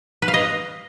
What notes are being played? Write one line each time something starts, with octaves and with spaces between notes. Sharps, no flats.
B4
F5
D#5